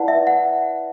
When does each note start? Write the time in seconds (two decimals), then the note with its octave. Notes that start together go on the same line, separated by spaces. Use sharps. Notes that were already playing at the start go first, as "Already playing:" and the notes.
Already playing: E4 B4 D5 F#5 A5
0.08 E5
0.27 F#5